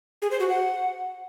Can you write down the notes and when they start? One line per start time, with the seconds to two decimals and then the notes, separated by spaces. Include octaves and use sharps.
0.22 G#4
0.31 C5
0.40 F#4
0.49 F#5